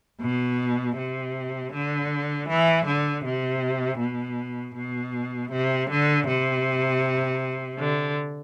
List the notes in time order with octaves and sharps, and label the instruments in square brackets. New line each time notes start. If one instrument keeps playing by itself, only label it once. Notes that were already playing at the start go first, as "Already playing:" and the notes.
[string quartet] B2
C3
D3
E3
D3
C3
B2
B2
C3
D3
C3
D3